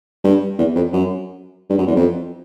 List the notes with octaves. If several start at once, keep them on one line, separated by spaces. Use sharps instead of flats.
G2
E2
F2
F#2
G2
F#2
E2
F2